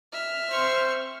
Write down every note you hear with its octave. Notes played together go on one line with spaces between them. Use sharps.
E5 F6
C4 C5 C#6